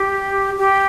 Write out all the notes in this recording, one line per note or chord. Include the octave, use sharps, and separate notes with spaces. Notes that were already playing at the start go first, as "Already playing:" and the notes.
Already playing: G4
G4